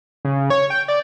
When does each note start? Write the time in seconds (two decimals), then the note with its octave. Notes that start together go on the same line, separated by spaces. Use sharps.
0.25 C#3
0.50 C#5
0.70 G5
0.88 D5